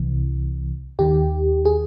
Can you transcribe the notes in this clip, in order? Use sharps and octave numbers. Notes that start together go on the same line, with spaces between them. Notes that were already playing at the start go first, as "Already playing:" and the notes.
Already playing: C2 C3 E3
D#2 D#3 G4
G#4